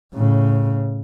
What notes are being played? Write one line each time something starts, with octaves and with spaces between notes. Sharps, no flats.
A2 C#3